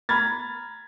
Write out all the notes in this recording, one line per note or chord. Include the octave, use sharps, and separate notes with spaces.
A#5 B5 F6 G#6 A6